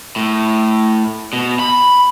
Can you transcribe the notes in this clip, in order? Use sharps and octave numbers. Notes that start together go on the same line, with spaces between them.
A2
B2
B5